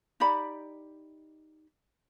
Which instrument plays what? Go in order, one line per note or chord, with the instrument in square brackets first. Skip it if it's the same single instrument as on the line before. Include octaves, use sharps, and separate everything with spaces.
[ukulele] D#4 G4 D5 B5